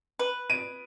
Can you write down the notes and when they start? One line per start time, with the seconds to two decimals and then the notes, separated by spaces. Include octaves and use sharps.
0.19 B4
0.50 D7 D#7